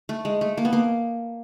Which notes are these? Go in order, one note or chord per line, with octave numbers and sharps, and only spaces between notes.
A3
G#3
A3
A#3
B3
A#3